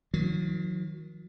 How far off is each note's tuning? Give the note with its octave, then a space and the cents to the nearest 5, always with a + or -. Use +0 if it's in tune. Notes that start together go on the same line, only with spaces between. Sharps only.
D#3 +25 F#3 -40